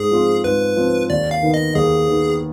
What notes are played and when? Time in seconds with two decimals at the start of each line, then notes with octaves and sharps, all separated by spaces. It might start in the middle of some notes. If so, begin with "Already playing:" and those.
Already playing: G#2 G#4
0.11 F3 C4 F4
0.44 G#2 B4
0.76 F3 C4 F4
1.10 D#2 D5
1.31 F5
1.43 D#3 B3
1.54 D#5
1.75 D#2 G#4
2.08 D#3 B3